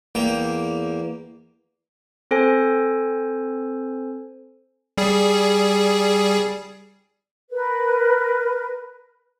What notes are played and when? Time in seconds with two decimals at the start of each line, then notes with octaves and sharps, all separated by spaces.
0.15 E2 A#3 G5
2.31 C4 A4 C5 G#5
4.97 G3 G#4
7.50 A#4 B4